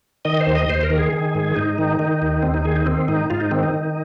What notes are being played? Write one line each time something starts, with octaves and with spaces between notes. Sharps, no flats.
D#3 D#5
C5
D#2
D#5
D#2 C5
A#4
D#3
G#4
D#3
G#2
G#2 D#4
D#3
D#3
D#2
D#2 C4
D#4
D#3 G#4
D#4
D#3 C4
G#2 D#4
G#2 F4
D#4
D#3 C4
D#4
D#3